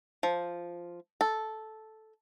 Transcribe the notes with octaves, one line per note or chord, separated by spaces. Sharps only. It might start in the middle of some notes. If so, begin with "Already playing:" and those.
F3
A4